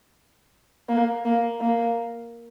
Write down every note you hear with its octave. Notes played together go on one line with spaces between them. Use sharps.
A#3
A#3
A#3